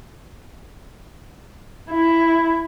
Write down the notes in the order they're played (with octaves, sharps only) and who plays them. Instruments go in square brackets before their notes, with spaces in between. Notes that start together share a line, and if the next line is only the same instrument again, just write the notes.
[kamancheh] E4